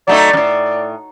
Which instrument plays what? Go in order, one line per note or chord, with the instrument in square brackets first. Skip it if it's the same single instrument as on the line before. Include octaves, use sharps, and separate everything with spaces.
[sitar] F#3 A3 D#4 [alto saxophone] D5
[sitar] F#2 A2